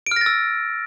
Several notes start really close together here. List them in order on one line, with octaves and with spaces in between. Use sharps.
D7 F6 A#6 A6 E6